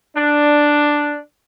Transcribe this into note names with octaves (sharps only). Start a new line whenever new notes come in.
D4